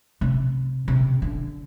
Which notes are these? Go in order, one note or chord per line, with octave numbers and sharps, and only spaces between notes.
C3
C3
D3